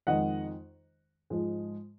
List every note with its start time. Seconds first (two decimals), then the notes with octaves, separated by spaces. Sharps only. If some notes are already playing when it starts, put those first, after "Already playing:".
0.07 F2 D#3 G#3 D#5 F#5
1.30 G#2 F3 G#3